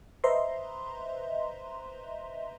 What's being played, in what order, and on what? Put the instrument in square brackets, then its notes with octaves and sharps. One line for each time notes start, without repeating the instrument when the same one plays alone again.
[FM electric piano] B4 C5 D#5 E5 A#5 C6